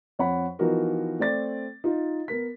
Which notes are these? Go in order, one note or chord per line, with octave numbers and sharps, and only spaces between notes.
F2 C#5 F#5 B5
E3 F3 B3 D#4 F#4 A#4
A3 C4 D5 A6
D#4 F4
B3 A#4 B6